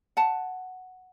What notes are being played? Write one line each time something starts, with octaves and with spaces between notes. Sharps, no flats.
F#5 A5